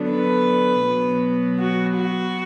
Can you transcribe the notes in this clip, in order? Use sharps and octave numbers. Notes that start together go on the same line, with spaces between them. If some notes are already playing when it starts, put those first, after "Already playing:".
Already playing: D3 F#3 B3 D4
B4
B2 F#3 B3
F#4
F#4